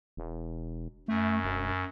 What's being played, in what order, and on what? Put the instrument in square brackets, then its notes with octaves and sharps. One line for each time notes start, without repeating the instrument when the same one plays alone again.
[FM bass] E1
[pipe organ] F#2 [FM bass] A3
[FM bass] E1